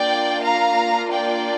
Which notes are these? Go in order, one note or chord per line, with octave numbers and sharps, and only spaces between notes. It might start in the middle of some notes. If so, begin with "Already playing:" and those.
Already playing: A#3 D4 F4 D5 G5
F5 A#5
D5 G5